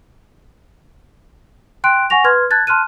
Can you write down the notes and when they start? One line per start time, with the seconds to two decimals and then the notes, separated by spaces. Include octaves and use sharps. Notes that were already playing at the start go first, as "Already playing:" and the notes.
1.84 G5 C6 F#6 D7
2.10 F#5 G#5 C#6 A#6 F7
2.24 B4 C6 F6 G#6
2.51 A5 F#6 G#6 A6
2.67 A5 C6 F6 F#6 D#7